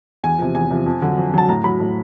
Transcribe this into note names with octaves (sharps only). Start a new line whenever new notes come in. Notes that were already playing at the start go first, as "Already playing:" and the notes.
E2 G#5
C3 F3
E2 G#5
C3 F3
F2
D3 F#3
F2
D3 F#3 A5
A2 A#5
F#3 B5
A2